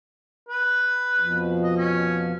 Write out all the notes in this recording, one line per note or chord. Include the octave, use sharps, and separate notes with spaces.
B4
F2 B2 F3
D#5
C#4